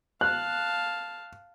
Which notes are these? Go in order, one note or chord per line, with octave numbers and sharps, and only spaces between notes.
F5 A5 F#6